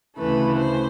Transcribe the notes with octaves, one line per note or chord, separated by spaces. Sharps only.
D2 C#3 E3 A3 B4
C5